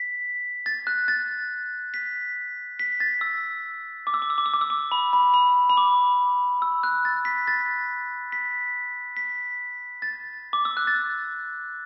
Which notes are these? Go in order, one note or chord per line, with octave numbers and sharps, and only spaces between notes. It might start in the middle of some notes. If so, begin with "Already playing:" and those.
Already playing: B6
A6
F#6
A6
B6
B6
A6
E6
D6
E6
D6
E6
D6
E6
D6
E6
D6
B5
B5
B5
B5
D6
E6
F#6
A6
B6
A6
B6
B6
A6
D6
E6
F#6
A6